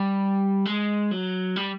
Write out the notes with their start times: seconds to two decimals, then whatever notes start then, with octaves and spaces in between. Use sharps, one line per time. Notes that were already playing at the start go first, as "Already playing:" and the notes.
Already playing: G3
0.65 G#3
1.11 F#3
1.56 G3